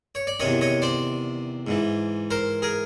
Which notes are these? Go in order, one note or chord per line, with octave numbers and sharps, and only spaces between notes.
C#5
D5
E2 C3 D#3 C#5 D#5
C#5 D#5
C5 D5
G#2 E3
A#4 C5
G#4 A#4